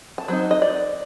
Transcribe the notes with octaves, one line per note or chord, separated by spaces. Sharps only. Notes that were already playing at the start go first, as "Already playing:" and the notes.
A5
F#3 C4 D#4
D#5
D5